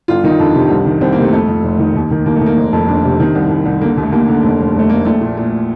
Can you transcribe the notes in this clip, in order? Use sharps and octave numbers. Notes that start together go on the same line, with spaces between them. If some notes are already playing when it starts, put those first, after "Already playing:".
G1 F4
D#3 D#4
F2 D4
C3
C2
D#3
C2 C4
A#3
C3 A3
F2 A3
F2
F1
D#3
D#2
D#3
D#2 A#3
A3
D#3
A#3
F1
F2
F1 D4
C3
D#3
C2
C2
C2
D3 A#3
D#2
A3
D#2 A#3
D3
F1
F1
F1 A3
F1 A#3
A#1 A3
A#2
A#2